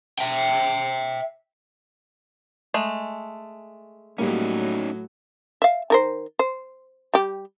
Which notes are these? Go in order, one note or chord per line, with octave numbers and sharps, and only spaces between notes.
E5 G5
G#3 A3
A2 F#3 G3 A#3 C#4 D#4
E5 F5
D#3 A#4 C5
C5
G3 G4